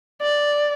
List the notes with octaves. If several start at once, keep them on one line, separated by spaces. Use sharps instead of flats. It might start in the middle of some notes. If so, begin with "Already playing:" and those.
D5